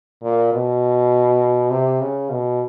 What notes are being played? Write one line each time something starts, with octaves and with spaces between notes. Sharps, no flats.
A#2
B2
C3
C#3
B2